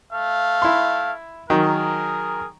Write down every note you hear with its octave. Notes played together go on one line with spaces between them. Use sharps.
A3 F5
E4 C6
D#3 F#3 G#4 A#4